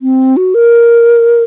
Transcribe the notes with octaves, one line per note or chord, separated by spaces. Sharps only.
C4
F#4
A#4